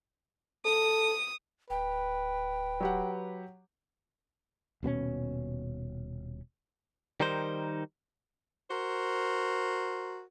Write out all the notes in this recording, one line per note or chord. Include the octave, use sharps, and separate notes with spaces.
A4 D#6
D1 B4 G5
F#3 G4 F#5
D#1 B2 B3 C#4
D#3 G3 D#4 A#4 C5
F#4 A#4 C5